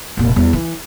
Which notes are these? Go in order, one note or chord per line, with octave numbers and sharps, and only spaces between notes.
F1 A#2
E2 G3
E3